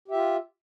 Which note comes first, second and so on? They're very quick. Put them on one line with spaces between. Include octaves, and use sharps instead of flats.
G4 E5 F4